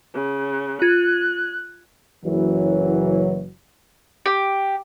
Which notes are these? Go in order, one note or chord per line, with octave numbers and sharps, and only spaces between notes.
C#3
F4 F#6 G#6
F#1 E3 F#3
G4